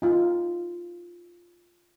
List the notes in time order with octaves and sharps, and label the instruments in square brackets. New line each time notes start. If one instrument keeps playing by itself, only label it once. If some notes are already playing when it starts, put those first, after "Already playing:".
[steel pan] D#4 F4